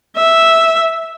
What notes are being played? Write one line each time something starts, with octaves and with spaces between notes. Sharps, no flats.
E5